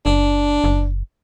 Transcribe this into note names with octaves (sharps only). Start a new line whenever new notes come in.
F#1 D4
F#1